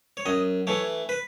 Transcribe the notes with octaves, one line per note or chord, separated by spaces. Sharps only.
C#5
F#2 D#5
E3 A3 C#5
B4